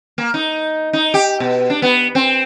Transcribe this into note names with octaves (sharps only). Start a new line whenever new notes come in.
A#3
D#4
D#4
G4
B2
D4
B3
C4